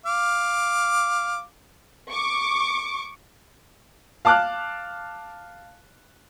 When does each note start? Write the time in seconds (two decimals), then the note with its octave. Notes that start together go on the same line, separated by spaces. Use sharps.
0.06 F5 D6
2.11 C#6 D6
4.25 F5 A5 D6 F6 F#6